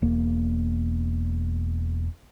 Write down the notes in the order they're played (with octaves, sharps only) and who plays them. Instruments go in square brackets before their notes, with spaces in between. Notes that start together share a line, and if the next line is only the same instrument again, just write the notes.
[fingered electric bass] E1 A#3